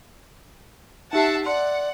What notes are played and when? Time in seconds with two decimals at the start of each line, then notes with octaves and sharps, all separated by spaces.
1.13 D#4 G4 E5 F#5 A5 C7
1.46 D5 F#5 C6